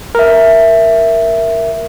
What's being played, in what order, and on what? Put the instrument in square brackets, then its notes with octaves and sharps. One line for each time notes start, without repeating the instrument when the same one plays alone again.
[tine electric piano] A#4 E5